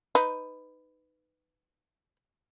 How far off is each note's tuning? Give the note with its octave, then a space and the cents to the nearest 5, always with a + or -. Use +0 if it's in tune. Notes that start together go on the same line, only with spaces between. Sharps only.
D#4 +0 B4 +15